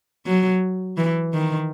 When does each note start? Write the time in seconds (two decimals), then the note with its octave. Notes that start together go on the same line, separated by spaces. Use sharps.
0.26 F#3
0.97 E3
1.33 D#3